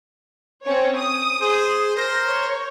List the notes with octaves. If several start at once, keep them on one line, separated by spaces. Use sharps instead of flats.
C4 C#4 C#5
D#6
G#4 C5
A#4 C5 A#6
C#5